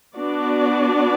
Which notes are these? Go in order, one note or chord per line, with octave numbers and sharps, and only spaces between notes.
B3 D4 F#4 D5